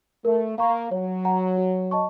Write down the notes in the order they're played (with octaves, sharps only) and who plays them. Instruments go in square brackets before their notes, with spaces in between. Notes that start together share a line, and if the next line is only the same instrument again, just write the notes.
[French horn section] A3 [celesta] A#4
[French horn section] A#3 [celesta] F5 A#5 C#6
[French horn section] F#3 [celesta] C#5
[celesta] F#5 A#5
F#4
D#5 A5 C#6